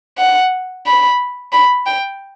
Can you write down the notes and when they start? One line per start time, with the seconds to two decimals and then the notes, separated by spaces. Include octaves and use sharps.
0.18 F#5
0.86 B5
1.52 B5
1.86 G5